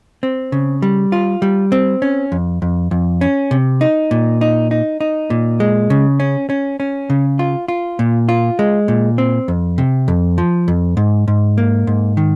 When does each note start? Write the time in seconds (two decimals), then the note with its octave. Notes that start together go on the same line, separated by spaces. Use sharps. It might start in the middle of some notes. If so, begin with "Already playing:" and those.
0.23 C4
0.52 C#3
0.82 G3
1.12 F4
1.42 G3
1.72 C4
2.02 C#4
2.32 F2
2.62 F2
2.91 F2
3.21 C#4
3.51 C3
3.81 D#4
4.11 A#2
4.41 D#4
4.71 D#4
5.01 D#4
5.30 A#2
5.60 G#3
5.90 C#3
6.20 C#4
6.50 C#4
6.80 C#4
7.10 C#3
7.39 F4
7.68 F4
7.99 A#2
8.29 F4
8.59 G#3
8.88 A#2
9.18 C4
9.48 F2
9.78 C3
10.08 F2
10.38 F3
10.68 F2
10.97 G#2
11.28 G#2
11.58 A#3
11.87 G#2
12.17 D#3